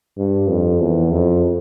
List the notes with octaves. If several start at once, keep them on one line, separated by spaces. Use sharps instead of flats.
G2
F2
E2
F2